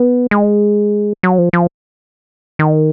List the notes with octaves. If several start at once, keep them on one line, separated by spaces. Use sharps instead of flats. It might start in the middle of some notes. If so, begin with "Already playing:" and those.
Already playing: B3
G#3
F#3
F3
F3
D#3